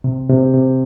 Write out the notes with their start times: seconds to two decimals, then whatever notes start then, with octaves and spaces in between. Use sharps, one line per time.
0.04 C3
0.29 C3
0.54 C3